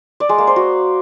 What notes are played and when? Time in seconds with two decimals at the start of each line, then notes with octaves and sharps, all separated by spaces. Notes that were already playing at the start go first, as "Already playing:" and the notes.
0.20 D5
0.29 G#3
0.38 A#3
0.47 C5
0.56 F#4